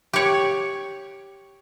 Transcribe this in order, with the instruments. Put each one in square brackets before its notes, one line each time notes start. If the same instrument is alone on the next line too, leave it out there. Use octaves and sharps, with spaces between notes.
[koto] G4 C#5